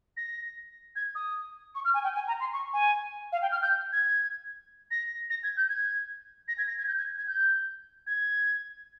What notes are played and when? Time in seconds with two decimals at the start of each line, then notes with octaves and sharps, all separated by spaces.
0.16 A#6
0.95 G#6
1.15 D#6
1.75 C#6
1.84 F6
1.94 G#5
2.03 G5
2.14 G#5
2.27 A#5
2.40 C6
2.52 C#6
2.73 G#5
3.32 F5
3.42 G5
3.51 F6
3.62 G6
3.92 G#6
4.90 A#6
5.29 A#6
5.43 G#6
5.56 G6
5.69 G#6
6.48 A#6
6.57 G#6
6.67 A#6
6.78 G#6
6.88 G6
6.97 G#6
7.17 G#6
7.27 G6
8.06 G#6